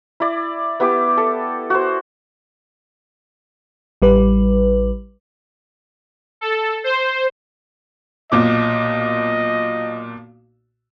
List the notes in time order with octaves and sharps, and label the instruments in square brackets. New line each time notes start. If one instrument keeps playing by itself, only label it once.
[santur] E4 D5
B3 E4 G4 D6
A4
F#4 C5
[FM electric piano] A1 G3 B4
[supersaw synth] A4
C5
[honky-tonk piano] B1 A#2 D6 [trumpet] D#5